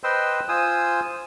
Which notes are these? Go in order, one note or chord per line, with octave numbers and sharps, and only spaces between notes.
B4 C5 D#5 G5 C6 E6
F4 C5 G#5 D#6 E6